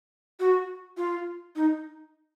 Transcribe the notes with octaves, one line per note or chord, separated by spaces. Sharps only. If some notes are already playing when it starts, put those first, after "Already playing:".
F#4
F4
D#4